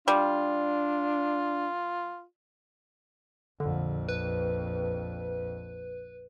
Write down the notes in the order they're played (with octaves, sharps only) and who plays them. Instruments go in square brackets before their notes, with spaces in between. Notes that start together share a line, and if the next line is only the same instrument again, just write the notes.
[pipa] G3 [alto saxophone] D4 [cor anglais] F4
[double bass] A#1 F2 [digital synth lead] D3
[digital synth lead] B4